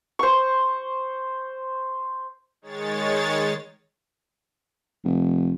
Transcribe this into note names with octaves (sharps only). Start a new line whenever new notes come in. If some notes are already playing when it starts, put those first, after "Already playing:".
C5 C#6
D#3 G#3 C#5 A6
F1